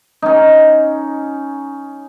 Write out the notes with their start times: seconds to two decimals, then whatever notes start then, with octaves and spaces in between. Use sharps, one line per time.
0.22 C#4 D#4